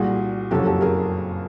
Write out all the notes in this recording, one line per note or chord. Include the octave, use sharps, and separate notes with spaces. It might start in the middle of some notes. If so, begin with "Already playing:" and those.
Already playing: C2 A#2 G3 F#4 G#4
F#1 F2 C#3 F#3 G4 A4
G4 A4
G#4 A#4